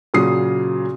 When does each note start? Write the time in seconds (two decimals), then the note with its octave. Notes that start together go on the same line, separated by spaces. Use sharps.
0.14 A#2 C#3 F#3 D#6 C7